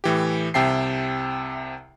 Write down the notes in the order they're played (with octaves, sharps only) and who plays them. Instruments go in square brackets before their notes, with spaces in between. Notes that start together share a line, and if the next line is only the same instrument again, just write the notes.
[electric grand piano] A2 E3 G4
C2 C3 E5 G5 A5 C7